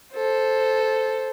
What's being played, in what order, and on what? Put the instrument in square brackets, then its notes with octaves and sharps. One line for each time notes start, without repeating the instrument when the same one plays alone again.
[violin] A4 C5